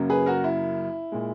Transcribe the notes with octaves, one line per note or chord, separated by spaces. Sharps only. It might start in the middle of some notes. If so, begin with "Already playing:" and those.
Already playing: F#2 C#3 F#3 A#3
G#4 B4
F#4 A#4
E4
A#2 G#3